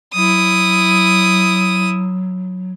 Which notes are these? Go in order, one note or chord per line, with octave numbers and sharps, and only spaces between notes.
F#3 E4 D#6